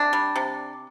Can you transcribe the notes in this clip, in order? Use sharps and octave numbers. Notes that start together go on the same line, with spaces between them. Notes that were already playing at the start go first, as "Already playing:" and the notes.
Already playing: C3 D4
G3
C3